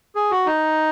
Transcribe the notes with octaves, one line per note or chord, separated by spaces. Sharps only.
G#4
F#4
D#4